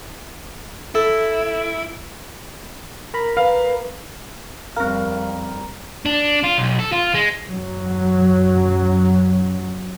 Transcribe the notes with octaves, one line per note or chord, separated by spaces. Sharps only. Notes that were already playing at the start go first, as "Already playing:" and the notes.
E4 A4
A#4 A#5 B5
B4 F5
F2 G3 C4 A#4 F5 F6
D4
F4
B1
A4
F4
G#3
F#2 F#3